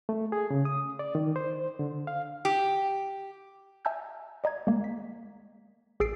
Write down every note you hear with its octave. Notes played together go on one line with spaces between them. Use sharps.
A3
G#4
C#3
D#6
D5
D#3
C5
D3
F5
G4
E5 G#5 A5 E6 F6 G6
D5 D#5 A#5 G#6
G#3 A#3
B6
A1 G#4 E6 A6 C7 D7